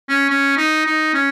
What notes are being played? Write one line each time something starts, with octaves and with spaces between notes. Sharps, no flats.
C#4
C#4
D#4
D#4
C#4